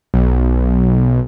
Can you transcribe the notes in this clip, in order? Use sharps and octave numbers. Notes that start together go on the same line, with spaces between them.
B1